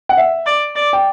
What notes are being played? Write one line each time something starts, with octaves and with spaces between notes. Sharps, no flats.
F#5
E5
D5
D5
G5